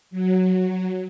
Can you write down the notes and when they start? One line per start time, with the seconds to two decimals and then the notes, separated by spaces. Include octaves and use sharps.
0.11 F#3